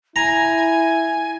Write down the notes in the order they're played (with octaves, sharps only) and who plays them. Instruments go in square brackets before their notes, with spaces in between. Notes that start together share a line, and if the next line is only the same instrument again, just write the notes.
[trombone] E4 [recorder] G#5 [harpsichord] A#5